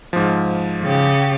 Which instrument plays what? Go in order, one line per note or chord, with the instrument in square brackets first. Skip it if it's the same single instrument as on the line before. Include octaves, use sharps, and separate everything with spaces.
[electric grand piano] G#2 F3
[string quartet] C#3 G4